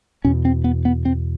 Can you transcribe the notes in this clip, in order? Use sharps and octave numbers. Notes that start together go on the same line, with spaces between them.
E2 B2 C#4
C4
B3
B3
C4